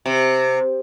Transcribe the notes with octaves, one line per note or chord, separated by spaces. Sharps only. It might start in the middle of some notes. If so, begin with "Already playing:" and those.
C3